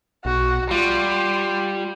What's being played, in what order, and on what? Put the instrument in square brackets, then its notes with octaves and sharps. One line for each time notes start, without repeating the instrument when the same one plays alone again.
[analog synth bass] B1 [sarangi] F#4
[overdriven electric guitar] G3 [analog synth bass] F4 [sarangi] C6